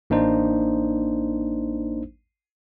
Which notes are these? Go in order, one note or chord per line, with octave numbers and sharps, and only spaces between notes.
A1 A#3 D4 D#4 C5